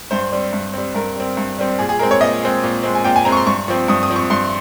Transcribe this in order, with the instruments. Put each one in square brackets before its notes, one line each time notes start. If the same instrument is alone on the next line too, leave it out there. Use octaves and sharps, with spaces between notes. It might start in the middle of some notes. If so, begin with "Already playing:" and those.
[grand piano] G2 C5
G3 C4
G2
G3 C4
G2 A#4
G3 C4
G2
G3 C4
A#2 G#4
G#4
G#3 C4 A#4
C#5
A#2 D#5
G#3 C4
A#2
G#3 C4
G#5
A#2 G5
G#5
G#3 C4 A#5
C#6
C6
G2 C#6
F3 C4
G2 D#6
D#6
F3 C4
C#6
G2 C6